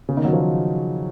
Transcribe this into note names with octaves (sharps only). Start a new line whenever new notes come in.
C#3
D#3
F#3
F3
D#3